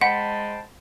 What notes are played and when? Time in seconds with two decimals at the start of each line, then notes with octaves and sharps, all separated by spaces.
0.01 G#3 C5 F#5 G5 A5 B5